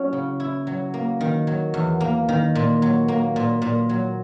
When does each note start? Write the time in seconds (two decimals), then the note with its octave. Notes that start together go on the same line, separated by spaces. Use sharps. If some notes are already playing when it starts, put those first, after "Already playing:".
Already playing: F#3 C#4 E4
0.13 C#3
0.40 E4
0.67 F#3
0.94 A#3
1.21 D#3
1.47 F#3
1.74 E2
2.01 A#3
2.29 D#3
2.55 A#2
2.82 F#3
3.08 A#3
3.36 A#2
3.62 A#2
3.89 F#3